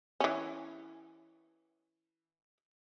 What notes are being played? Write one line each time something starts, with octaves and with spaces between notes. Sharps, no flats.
E3 C#4